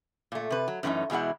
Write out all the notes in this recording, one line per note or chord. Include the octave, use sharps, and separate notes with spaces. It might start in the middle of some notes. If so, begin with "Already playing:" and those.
A#2 A3
C3 B4
F#3
F#2 E3 A3 C4 C#4 D#4
E2 B2 G#3 E4 F#5